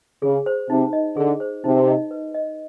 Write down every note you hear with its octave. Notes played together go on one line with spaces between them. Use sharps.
C#3 G#4
C5
C3 D#4
D#5
D3 G#4
C5
C3 D#4
D#5
B4
D#5